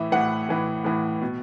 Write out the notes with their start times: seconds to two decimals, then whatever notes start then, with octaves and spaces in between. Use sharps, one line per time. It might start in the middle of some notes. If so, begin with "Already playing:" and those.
Already playing: A2 E3 E5
0.12 A2 E3 F#5
0.49 A2 E3
0.84 A2 E3
1.21 B2